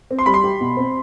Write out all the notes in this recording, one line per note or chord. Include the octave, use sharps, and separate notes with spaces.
C4
C6
G3 B5
C6
G4
B2
C4